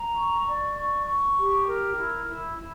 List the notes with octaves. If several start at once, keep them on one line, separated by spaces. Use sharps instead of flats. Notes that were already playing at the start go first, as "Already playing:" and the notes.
Already playing: A#5
C#6
D5
C#6
C#6
G4
A#4
E4
E4
E4